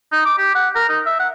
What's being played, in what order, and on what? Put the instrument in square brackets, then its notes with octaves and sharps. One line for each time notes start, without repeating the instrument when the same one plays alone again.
[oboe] D#4
D6
G4
F#5
A#4
D#4
E5
F#5